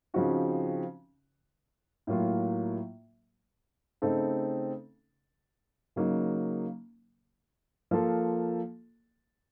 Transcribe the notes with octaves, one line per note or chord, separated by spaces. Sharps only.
C#3 F3 C4 D#4 F#4
A2 F#3 A#3 F4
C#3 A3 C4 D#4 A4
C#3 F#3 A#3 D#4
F3 A#3 F4 A4